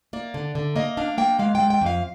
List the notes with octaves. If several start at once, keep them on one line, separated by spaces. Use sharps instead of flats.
A#3 D5
D3
D3
A#3 D#5
D4 F5
A#3 G5
G#3 F5
G#3 G5
G5
F2 F5